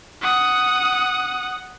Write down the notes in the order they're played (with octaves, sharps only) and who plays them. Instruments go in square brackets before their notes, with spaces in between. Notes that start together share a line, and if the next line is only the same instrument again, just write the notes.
[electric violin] F#5 D#6